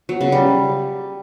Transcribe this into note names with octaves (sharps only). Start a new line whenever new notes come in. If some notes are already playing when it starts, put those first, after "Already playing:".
F#3
C#3
G3